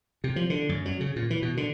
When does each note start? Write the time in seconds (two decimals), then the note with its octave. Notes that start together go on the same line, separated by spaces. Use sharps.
0.24 C3
0.36 F3
0.50 D3
0.69 F#2
0.85 F#3
1.01 C#3
1.16 A#2
1.30 E3
1.42 B2
1.57 D3